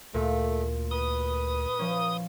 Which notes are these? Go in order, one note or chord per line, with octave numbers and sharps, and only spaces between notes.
D2 A#2 A3
B4 D#6
F3 C#4